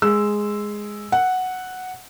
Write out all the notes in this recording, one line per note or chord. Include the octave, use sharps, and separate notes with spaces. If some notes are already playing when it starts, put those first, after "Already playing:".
G#3 E6
F#5